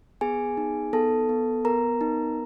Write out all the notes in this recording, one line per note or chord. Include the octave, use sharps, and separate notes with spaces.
B3 G#4 G#5
D#4
B3 A4 A5
B3
B3 A#4 A#5
D#4